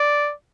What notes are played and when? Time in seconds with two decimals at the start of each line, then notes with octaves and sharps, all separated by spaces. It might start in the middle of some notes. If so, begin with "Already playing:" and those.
Already playing: D5